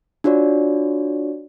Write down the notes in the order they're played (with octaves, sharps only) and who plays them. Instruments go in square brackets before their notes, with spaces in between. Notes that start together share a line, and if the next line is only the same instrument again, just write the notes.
[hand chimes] D4 F4 F#4 C#5 D5